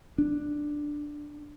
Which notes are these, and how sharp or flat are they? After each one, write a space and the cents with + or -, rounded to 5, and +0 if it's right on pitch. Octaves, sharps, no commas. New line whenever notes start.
D4 +5